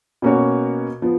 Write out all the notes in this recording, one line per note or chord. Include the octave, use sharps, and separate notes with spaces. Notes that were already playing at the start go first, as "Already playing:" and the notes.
B2 A#3 C#4 F#4 C#5
F3 B3